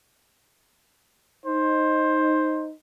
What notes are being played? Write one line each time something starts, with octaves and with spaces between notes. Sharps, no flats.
D#4 C5